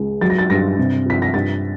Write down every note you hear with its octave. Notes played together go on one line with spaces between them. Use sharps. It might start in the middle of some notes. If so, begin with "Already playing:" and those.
Already playing: C#2 G#3
F#3 A6
A#6
A6
G2 A#6
C3
F3 B6
A#6
G2 A6